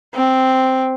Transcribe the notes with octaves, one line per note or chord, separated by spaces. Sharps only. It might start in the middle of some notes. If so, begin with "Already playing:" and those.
C4